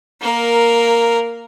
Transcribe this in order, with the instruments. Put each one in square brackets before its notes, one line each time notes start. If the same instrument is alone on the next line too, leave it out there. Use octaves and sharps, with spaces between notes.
[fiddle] A#3 A#4